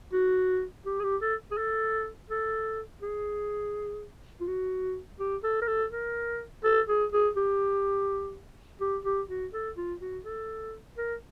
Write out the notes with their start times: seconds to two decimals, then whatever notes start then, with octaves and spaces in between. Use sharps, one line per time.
0.13 F#4
0.86 G4
1.00 G#4
1.04 G4
1.22 A4
1.52 G#4
1.58 A4
2.30 A4
3.02 G#4
4.41 F4
4.47 F#4
5.20 G4
5.44 A4
5.62 A#4
5.67 A4
5.92 A#4
6.64 A4
6.88 G#4
7.12 G#4
7.37 G4
8.81 G4
9.05 G4
9.29 F#4
9.53 A4
9.77 F4
10.02 F#4
10.25 A4
10.98 A#4